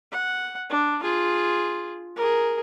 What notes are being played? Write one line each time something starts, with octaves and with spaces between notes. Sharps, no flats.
F#5
D4
F4 G#4
G#4 A#4